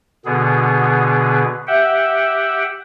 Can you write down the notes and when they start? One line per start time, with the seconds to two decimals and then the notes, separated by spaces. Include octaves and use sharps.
0.25 B2 D3 B3 G#4
1.67 G4 E5 F#5 G5